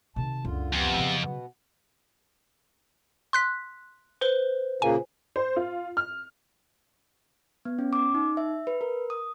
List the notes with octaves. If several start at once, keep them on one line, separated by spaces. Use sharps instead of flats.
C3 D#3 A5
C#2 F#2 D3 F4
F2 C3 B3
C#3 F#3
B2 B3
C6 F#6 B6
B4 C5 G7
A#2 C#3 A#3 G#5
C5
F4
F6
B3
C#4
D6
D#4
E5
B4
A#4
D#6